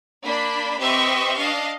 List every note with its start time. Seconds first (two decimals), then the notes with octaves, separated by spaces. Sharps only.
0.23 A#3 D4 B5
0.80 C4 G4 B4 D#5 E5 C#6
1.36 D4 D#5 F5